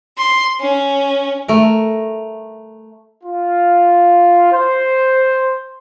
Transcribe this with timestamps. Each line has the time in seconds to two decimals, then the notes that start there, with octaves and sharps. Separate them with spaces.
0.17 C6
0.60 C#4
1.48 A3 A#4
3.24 F4
4.52 C5